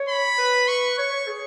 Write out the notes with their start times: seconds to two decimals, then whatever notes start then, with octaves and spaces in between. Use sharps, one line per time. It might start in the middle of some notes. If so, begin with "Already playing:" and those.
Already playing: C#5
0.09 B5
0.38 B4
0.68 C#6
0.99 C#5 C#6
1.13 C#5
1.28 G#4